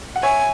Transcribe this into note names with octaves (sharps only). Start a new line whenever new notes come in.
F#5
C#5 E5 G#5